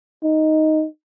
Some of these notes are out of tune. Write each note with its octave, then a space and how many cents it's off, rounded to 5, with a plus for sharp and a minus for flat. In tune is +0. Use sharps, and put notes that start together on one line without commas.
D#4 +5